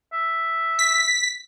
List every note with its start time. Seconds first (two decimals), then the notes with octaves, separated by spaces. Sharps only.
0.12 E5
0.79 B6